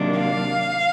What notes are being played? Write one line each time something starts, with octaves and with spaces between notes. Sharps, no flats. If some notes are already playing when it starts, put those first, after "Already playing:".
Already playing: C3 D#3 F#3 A#3 D4
F5